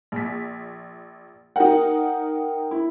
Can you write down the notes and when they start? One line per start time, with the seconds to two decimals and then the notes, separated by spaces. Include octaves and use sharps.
0.12 A#1 B6
1.56 D#4 A#4 F#5 G5
2.71 E4